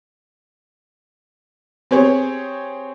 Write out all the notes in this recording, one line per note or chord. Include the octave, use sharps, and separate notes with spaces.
C4 G4 G#4 C#5